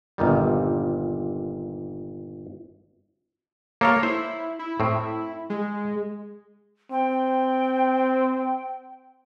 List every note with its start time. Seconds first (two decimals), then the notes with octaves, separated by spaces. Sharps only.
0.18 G1 A#2 D#3 G3
3.81 A#3 A4 A#4 C#5
4.03 E4 C5
4.59 E4
4.80 A2 C4
5.50 G#3
6.91 C4 G5